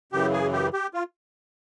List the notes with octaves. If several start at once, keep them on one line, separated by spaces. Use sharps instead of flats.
F#2 C#3 E3 G4
G#4
G4
G4
F4